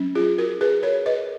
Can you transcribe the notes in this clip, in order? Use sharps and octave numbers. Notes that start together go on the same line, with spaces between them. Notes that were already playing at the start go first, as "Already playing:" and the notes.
Already playing: F#3 C#4
F4 G#4
F#4 A#4
G#4 B4
A#4 C#5
B4 D#5